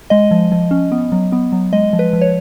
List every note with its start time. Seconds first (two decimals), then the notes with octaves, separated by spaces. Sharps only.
0.10 G#3 D#5
0.31 F3
0.52 F3
0.71 C#4
0.92 B3
1.12 F#3
1.32 B3
1.52 F#3
1.73 G#3 D#5
1.93 F3
1.99 B4
2.13 F3
2.21 C#5